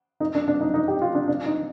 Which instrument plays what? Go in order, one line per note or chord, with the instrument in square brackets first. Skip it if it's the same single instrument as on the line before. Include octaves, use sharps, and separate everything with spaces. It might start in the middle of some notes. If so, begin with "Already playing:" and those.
[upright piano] D#4
D4
D4
D#4
D#4
G4
F4
D4
D4
D#4